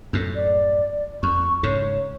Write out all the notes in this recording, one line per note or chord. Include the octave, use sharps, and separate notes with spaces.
F#2 A2
D5
F2 C#6
G#2 C#3 C#5